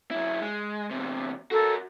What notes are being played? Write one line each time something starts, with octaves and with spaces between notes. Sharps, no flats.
F#2 E4
G#3
E2 C3
F#4 A4 A#4